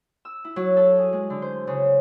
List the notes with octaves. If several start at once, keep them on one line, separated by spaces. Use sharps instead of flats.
E6
E4
F#3
A4
G#4
G#3
D3
C5
C#3